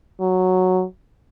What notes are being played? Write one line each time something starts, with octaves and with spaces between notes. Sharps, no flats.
F#3